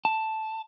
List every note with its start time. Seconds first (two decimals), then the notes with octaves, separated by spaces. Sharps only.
0.05 A5